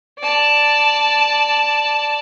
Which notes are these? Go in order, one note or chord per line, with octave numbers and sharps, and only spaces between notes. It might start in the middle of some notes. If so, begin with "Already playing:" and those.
D5 A5